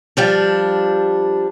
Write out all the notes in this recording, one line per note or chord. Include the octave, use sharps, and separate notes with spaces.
F3 G3 D4